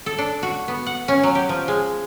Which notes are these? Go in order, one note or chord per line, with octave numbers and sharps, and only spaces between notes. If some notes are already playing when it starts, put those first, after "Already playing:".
A4
D4
F#4
B3
F#5
C#4
F#3
G4
F3
G#3